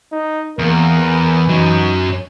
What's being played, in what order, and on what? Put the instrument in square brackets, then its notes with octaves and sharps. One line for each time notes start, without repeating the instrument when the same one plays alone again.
[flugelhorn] D#4
[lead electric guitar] E2 [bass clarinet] A#3 [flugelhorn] A#4
[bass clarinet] E3
[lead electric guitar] F#2 F#3 [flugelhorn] D#4